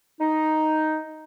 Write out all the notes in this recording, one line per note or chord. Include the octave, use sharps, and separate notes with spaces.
D#4